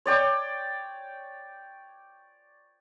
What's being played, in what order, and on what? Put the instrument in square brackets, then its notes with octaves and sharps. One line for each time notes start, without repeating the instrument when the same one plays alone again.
[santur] C#5 D5 G5 C#6